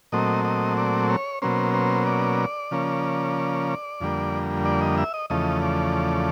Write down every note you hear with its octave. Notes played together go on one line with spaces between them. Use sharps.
A#2 F#3 A3 C4 D#5
D#5
D5
C#5
B2 F#3 A#3 C#4 C5
C5
D5
C#3 F3 A#3 C#4
F2 D3 G3 A#3
D5
D#5
E5
D#5
E2 C#3 F3 A3 D#5
D5